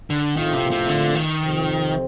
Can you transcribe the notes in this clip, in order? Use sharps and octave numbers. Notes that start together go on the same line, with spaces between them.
D3
A#1 A2 D#3 A3 C4 F4
C3
C3
D3
D#3
F2 C3 F3 C4